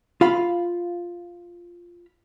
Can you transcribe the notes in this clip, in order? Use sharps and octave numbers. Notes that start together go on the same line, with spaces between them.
F4 F5 B5